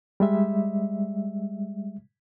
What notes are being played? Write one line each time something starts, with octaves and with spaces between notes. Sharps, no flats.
G3 G#3 E5